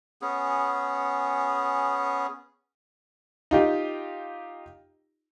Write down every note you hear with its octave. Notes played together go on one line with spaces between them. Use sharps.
B3 C#4 G#4
D#4 F4 G4